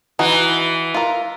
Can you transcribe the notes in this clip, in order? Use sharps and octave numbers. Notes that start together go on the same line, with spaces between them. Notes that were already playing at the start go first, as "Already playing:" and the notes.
E3 D#4 F#4
F4 A#4